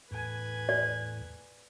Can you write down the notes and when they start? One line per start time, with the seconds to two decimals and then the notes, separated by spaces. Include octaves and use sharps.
0.11 E2 A2 B4 G#5
0.69 D5